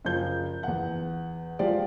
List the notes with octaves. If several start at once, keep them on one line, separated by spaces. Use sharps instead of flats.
F#1 F3 G6
E2 F#5
F3 G#3 F4 G4 D5